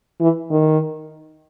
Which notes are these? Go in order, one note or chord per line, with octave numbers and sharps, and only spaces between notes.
E3
D#3